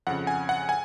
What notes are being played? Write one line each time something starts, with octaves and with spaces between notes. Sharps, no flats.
F2 C#3 F#5
G#5
F#5
G#5